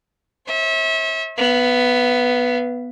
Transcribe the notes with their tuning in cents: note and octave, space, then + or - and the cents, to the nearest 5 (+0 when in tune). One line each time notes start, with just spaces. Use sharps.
C#5 -45 E5 -30
B3 +0 F5 -40